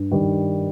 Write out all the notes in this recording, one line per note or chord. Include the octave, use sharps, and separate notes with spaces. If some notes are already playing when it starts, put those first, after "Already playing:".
Already playing: G2
D#3 G3